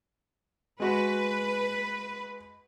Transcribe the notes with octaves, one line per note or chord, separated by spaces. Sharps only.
G#3 F#4 B4